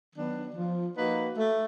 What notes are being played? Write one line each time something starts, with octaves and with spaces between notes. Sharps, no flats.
D#3 F#3 B3 D4
F3
A#3 D#4 F#4 B4
A3